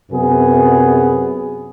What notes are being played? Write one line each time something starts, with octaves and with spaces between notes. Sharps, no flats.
F#2 C3 B3 G#4